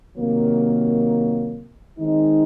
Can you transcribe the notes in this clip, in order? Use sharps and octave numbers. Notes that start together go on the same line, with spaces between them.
C3 D#3 F#3 A#3
D#3 G#3 C4 D#4